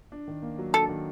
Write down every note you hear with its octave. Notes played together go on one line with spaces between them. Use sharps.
D4
D#3
A#3
F#3
D4 A4
D#3